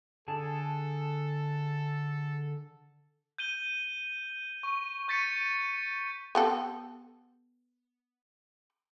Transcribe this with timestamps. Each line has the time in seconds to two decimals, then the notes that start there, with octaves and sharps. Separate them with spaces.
0.28 D3 G#4 A4 A5
3.38 G6 D#7 G7
4.63 C#6
5.08 C#6 G6 A6 B6 C#7 D#7
6.35 B3 G4 A4